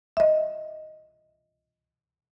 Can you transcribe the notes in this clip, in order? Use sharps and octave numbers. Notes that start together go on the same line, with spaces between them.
D#5 E5